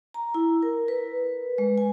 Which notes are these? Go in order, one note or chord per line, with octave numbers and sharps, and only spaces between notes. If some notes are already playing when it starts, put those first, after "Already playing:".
A#5
E4
A#4
B4
G#3
G#5